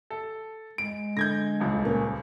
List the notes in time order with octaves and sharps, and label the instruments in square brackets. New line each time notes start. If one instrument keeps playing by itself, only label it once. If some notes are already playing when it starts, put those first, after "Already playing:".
[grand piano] A4
[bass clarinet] G#3 [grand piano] D7
[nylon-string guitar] D3 [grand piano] G6 G#6 A#6
[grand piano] D#1 C#2
[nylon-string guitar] A#2 A#4 B4 [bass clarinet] C#4